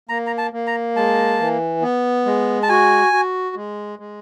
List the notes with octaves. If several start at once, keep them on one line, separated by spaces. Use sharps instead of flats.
A#3 A#5
A#5
A5
A#3
A#5
G#3 A5
E3
B3
G#3
A5
F#4 G#5
F#4
G#3
G#3